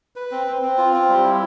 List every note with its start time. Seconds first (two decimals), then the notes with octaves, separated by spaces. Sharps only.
0.16 B4
0.31 C4
0.47 C4
0.62 C4
0.78 F4
0.93 C4
1.09 G3
1.23 E4